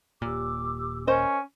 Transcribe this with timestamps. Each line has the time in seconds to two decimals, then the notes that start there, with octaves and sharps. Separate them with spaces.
0.22 D#1 A#2 G4 D6 E6
1.07 C#4 A#4 C5 D#5